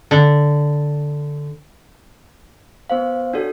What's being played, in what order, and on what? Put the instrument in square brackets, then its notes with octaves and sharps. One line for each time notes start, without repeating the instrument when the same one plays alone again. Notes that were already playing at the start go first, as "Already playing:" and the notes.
[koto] D3
[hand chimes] B3 C5 F5
D4 F#4 A4 C#5